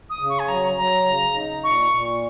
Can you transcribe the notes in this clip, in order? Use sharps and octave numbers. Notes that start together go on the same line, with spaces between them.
D#6
C#3
C#6
G#5
F#3 A#5
F#3 A#5
C#3
D#4
A#2 C#6
A#2